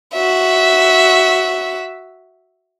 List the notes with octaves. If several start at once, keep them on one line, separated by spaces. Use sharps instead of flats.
F#4 E5